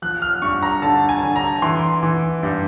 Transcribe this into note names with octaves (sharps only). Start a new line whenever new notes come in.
F3 F#6
F6
G2 C#6
A#5
D3 A5
G#5
D3
A#5
E3 C6
E3
G2